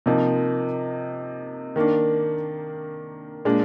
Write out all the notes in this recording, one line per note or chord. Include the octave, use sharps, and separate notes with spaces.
C3 F3 A#3 D#4
D#3 A#3 D4
A#2 G#3 D4